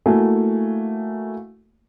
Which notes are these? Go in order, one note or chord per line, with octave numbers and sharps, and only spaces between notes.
A3 A#3 E4 F#4 G#5